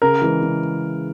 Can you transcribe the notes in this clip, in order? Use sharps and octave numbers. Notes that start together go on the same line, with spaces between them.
C#3 A#4
E3 G#3
C#3